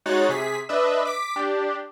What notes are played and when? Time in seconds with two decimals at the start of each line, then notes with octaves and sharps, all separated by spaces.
0.06 G#3 D#4 F#4 C#5 F#6 A6
0.29 C3 G#4 B6
0.69 D4 B4 D#5 E5
1.05 D6 B6
1.36 D4 G4